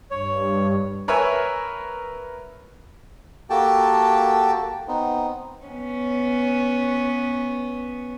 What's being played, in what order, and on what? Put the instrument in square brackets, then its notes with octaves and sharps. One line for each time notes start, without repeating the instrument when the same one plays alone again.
[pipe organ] G2 [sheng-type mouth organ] C#5
[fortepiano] A#4 B4 C#5 E5 G#5
[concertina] A#3 F#4 G4 A4 G5 A5
B3 C4 D#4
[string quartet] B3 C#4